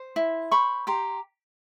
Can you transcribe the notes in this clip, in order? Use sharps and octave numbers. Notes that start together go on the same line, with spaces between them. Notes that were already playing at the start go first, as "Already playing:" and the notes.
Already playing: C5
E4
C5 B5 C#6
G4 A#5 C6